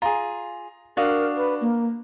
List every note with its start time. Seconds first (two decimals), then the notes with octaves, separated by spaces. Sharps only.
0.02 F4 G#4 A#5
0.97 D4 F#4 A#4 F5 D#6
1.36 B4
1.61 A#3